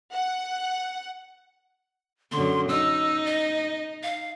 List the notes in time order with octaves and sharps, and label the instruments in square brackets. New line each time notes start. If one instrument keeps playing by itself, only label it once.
[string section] F#5
[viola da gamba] F#2 D3 [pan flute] C6
[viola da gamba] D#4 [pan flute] E6
[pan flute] D#5
F5